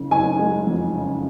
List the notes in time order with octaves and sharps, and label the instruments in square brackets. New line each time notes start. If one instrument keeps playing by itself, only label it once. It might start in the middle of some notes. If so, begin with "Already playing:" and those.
Already playing: [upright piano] F#1 C#3
F#1 G#5
G#3
F2
C#3